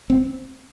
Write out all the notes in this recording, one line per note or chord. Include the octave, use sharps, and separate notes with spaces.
C4